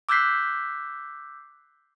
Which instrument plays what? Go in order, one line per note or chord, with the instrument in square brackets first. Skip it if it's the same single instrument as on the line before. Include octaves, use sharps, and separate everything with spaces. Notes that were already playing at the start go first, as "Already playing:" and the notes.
[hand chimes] D6 E6 F#6 G6 B6 C7